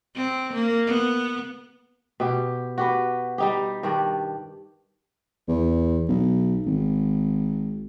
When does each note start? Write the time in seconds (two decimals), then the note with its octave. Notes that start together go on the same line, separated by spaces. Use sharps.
0.15 C4
0.53 A#3
0.87 B3
2.20 B2 G4
2.78 F#4 G4 B4
3.38 G3 D#4 G4
3.83 G2 D#3 D4
5.48 E2
6.09 B1
6.66 G#1